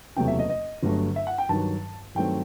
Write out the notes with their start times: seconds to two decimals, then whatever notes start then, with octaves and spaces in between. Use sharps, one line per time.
0.16 F#1 E2 C3 F#3 A3 G5
0.28 E5
0.39 D#5
0.49 D#5
0.83 G1 G2 F#3 A3
1.16 E5
1.27 F#5
1.38 G5
1.49 G2 D#3 F#3 A5
2.15 G2 D#3 F#3 A3 C4 G5